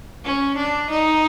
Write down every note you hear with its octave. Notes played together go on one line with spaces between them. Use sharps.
C#4
D4
D#4